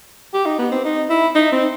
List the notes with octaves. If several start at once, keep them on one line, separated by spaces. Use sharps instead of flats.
G4
D#4
B3
C4
D#4
E4
D#4
C4